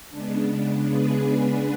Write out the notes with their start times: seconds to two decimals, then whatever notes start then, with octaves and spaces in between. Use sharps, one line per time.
0.10 C#3 G#3 B3 D4
0.87 G#4 B4